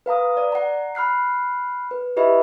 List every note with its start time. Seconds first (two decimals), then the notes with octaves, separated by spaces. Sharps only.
0.06 B4 F5 A#5 D#6
0.37 D5
0.52 F#5 A#5
0.95 B5 F6 F#6 C7
1.91 B4
2.16 E4 G4 B4 D#5 E5 B5